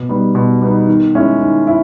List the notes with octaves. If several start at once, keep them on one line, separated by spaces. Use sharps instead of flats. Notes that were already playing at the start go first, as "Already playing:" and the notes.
Already playing: B2
G3 B3 D#4
B2
G3 B3 D#4
D#3
G#3 C#4 E4
D#3
E4